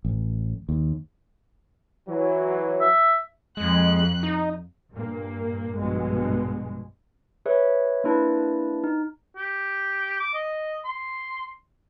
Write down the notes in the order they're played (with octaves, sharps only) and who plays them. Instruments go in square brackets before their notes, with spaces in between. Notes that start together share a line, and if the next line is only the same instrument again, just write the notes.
[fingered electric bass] A1
D#2
[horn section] E3 F#3
[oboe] E5
[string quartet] F2 F#6 [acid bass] G#3
[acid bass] D#4
[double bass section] G2 A#2 A#3
A#1 G2 B2 G#3
[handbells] G#4 B4 C#5 E5
A#3 D4 E4 B4 A5
D#4
[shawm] G4
D6
D#5
C6